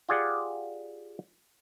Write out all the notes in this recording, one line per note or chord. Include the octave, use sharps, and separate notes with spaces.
F4 G4 G#4 D5 F5 F#5